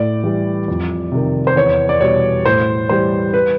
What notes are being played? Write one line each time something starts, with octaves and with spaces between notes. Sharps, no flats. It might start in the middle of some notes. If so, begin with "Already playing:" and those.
Already playing: A2 D5
E3 G3
F2
C3 D#3
C5
E2 C#5
D5
B2 G3 C#5
A2 C5
E3 G3 C5
B4